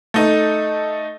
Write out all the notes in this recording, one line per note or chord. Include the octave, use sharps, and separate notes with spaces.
A3 D#4